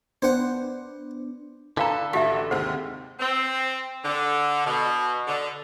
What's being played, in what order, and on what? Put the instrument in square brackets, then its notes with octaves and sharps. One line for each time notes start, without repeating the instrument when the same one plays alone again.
[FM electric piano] B3 D4 [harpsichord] C5 F#5
[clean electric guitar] D3 A4 [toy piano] D4 F5 A#5 [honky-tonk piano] B4
[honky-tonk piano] A1 F#4 B6 [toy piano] G4 E5
[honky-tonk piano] D#2 G#2 C3 [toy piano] C5 F#5
[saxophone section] C4
D3
B2
D3